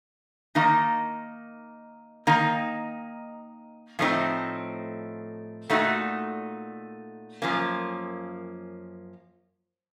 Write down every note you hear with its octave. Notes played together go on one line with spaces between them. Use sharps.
D#3 A#3 D#4
D#3 A#3 D#4
A2 F3 A3 C4 D#4
A#2 A3 D#4 F#4
F#2 F3 A#3 C#4